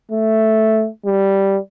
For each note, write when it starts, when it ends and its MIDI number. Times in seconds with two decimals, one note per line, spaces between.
0.12 0.88 57
1.06 1.58 55